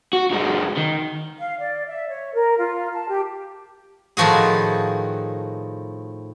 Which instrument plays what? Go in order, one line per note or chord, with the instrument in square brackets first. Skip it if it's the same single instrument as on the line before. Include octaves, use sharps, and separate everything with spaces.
[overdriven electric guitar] F#4
F#2 G#3
D#3
[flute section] F5
D5
E5
C#5
A#4
F4
A5
G4
[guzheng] A2 D#3 F3 F#4 G#4